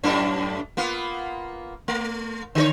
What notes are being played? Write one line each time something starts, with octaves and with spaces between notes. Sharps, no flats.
F#2 A2 D4
A#3 B3 F4
A3
D3 G4 C#5